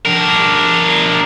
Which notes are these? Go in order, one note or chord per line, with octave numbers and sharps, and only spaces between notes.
D4 A#4